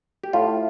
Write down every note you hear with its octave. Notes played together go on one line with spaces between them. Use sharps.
G4
A2 F4